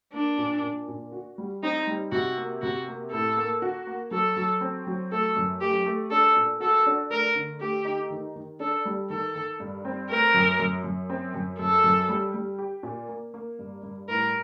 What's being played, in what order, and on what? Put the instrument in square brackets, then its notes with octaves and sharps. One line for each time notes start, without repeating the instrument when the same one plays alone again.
[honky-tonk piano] A#3 [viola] D4
[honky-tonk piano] A#2
A#2
A#2
F#4
G3
[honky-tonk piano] C4 [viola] D#4
[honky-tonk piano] G3
[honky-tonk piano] C3 [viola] F#4
[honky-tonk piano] A#3
[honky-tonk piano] C3 [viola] F#4
[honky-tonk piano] A#3
[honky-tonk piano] A2 [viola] A4
[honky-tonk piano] A#3
F#4
A#3
[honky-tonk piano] F#3 [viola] A4
[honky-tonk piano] F#3
C4
F#3
[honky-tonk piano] A3 [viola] A4
[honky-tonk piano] F#2
[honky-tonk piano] A3 [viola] G4
[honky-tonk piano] A3
[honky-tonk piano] D4 [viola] A4
[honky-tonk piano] A#2
[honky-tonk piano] F#4 [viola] A4
[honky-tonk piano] D4
[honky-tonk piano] A3 [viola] A#4
[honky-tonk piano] D3
[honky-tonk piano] A3 [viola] G4
[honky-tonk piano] D#4
D#3
D#3
[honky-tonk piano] D4 [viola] A4
[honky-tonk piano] G3
[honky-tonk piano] D#3 [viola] A4
[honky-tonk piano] D#3
G2
C4
[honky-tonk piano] A3 [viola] A#4
[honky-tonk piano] F#2
F#2
F#2
C4
F#2
[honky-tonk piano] F#2 [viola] A4
[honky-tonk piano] F#2
G3
G3
G4
A#2
A#3
A#3
G2
G2
[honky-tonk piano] A2 [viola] A#4